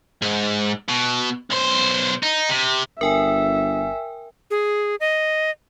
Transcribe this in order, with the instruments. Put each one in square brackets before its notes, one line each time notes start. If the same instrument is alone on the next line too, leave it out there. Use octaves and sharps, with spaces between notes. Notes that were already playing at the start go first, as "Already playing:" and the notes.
[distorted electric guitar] G#2
B2
B1 C5
D#4
C3
[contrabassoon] G1 [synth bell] A#4 G5 G#5 [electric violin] E5
[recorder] G#4
D#5